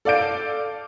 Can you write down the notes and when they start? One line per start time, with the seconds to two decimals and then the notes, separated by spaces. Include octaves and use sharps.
0.05 A4 D5 F5 G6 D7